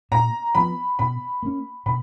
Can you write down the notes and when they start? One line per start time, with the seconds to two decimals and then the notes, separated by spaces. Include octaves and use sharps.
0.11 A#2 A#5
0.55 F3 B3 B5
0.99 B2 B5
1.43 A#3 C#4
1.86 B2 B5